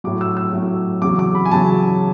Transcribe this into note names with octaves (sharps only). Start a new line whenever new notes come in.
A2 F#3 D6
E6
E6
A2 F#3
E2 C#3 F#3 D6
D6
B5
G#5
E2 C#3 F#3 A5